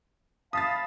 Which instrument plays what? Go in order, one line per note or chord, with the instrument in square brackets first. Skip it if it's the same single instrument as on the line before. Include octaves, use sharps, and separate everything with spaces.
[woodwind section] F5 A5 B5 [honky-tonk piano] D#6 A6